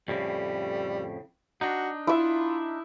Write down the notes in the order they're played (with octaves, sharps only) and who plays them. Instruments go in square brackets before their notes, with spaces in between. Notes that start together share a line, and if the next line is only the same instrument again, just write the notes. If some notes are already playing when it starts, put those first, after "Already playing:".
[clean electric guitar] F2 A2 C#3 [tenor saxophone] G3
[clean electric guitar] D4 D#4 [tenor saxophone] F#4
[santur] E4 E5 [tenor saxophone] F4